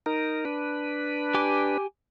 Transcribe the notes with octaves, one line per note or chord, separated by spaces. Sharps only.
D#4 A#4
D4 B4
G4 G#5 D6